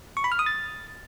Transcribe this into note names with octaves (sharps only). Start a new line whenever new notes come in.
C#6
B5
F6
D#6
A6